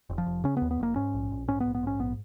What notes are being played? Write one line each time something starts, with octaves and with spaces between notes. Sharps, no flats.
F1
F3
F1
C#3 C#4
D#2 B3
B3
F1 A#3
G#2 C#4
A#1
A#1
G#2 C#4
A#1 B3
B3
G#2 C#4
A#1 B3